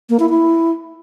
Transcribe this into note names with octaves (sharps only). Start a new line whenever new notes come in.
A#3
E4
E4